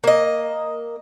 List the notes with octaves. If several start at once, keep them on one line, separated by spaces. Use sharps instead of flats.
A#3 D#5